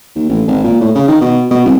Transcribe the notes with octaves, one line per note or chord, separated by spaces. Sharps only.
D#2
A1
G#1
A#2
A2
C#3
D#3
B2
B2
C2